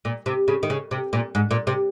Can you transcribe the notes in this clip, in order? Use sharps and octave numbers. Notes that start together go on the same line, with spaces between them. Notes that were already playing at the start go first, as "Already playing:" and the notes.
A#2
C3
C#3
D#3
C#3
C3
A#2
G#2
A#2
C3